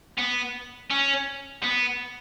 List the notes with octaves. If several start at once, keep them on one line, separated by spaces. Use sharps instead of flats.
B3
C#4
B3